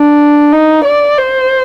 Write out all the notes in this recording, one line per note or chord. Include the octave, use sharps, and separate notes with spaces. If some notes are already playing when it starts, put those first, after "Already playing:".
Already playing: D4
D#4
D5
C5